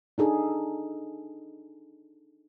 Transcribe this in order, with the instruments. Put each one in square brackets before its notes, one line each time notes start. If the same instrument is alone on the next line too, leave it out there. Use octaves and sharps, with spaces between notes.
[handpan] D4 D#4 G#4 A4